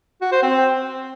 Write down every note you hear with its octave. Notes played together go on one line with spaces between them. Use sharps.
F#4
C5
C4